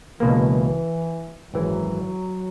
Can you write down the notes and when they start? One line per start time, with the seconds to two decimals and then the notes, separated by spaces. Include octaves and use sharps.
0.20 C#2 B2 E3 A#3
1.53 G#1 F#2 E3 F#3